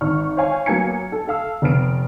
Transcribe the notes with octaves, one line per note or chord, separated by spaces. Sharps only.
G#1 C#6 F6
C5 C#5 F5 G#5 C#6
F#3 A#3 B3 G#5 G#6 C#7
A4
A4 F5 E6
F1 B3 F6 D7